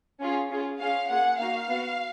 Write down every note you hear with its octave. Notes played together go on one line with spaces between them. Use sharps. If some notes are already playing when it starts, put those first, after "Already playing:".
C#4 F4 G#4
C#4 F4 G#4
C#4 F4 G#4 F5
A#3 F4 G#4 F#5
A#3 D#4 F#4 F5
B3 F#4